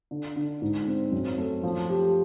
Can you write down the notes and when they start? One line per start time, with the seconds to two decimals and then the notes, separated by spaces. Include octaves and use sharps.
0.11 D3
0.36 D3
0.61 G#2
0.87 C4
1.12 F#2
1.38 A3
1.63 F3
1.90 G4